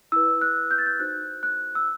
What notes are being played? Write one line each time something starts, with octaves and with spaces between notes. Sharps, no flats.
E4 B4 E6
F#6
G6
A6
G6
D#4 F#4 C5 F#6
F#6
E6